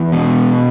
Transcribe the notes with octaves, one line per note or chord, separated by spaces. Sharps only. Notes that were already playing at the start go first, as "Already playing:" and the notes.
Already playing: E2
B2